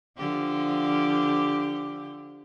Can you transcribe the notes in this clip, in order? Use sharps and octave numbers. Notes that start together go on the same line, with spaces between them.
D3 F3 G4